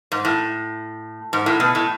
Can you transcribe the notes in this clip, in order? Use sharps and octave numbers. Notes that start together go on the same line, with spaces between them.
G#2
A2
G#2
A2
B2
A2